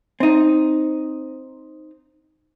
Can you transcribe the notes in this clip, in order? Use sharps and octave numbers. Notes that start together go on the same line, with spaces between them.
C4 D#4